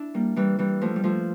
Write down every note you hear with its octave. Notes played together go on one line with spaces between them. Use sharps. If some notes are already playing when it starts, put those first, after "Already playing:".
Already playing: D4 E4
G3 A#3
E3 G3
E3 G3
F3 A3
G3
F3 A3